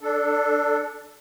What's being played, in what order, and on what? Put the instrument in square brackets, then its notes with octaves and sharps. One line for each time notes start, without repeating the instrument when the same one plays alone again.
[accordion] D4 A4